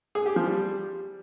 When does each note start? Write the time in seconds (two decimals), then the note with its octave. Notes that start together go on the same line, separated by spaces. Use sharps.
0.15 G#4
0.26 G4
0.36 F3
0.47 G3